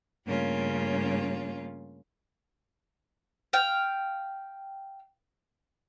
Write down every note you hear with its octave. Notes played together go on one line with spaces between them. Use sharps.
G2 C#3 A3 A#3 C#4 F4
F5 G5